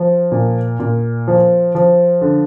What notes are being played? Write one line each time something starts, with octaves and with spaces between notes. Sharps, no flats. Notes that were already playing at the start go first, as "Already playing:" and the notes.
Already playing: F3
A#2
A#2
F3
F3
D3